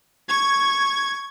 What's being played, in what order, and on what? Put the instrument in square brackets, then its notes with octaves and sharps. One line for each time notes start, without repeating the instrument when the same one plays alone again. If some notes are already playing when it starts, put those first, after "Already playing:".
[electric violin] C#6 [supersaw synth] G#6